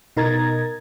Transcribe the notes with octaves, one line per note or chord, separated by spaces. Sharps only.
B2 D#4 A#4 A#5 G#6 A6